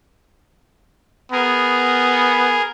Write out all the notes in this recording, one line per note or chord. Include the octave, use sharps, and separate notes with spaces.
B3 G#4 A#4